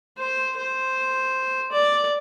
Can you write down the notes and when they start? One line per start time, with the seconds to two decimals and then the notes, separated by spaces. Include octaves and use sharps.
0.18 C5
0.57 C5
1.72 D5